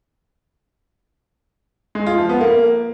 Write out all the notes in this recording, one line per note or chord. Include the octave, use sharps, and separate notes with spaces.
G#3
F4
F3
B3
A#3